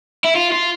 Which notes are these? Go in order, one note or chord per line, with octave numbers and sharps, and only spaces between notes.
E4
F4
F4